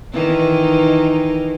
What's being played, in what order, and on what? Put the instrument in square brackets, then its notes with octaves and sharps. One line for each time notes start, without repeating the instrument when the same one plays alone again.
[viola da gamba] D#3 E3 D#4